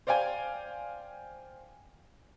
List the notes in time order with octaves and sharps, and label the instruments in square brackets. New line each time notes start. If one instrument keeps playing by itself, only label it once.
[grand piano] C5 D5 F5 G5 G#5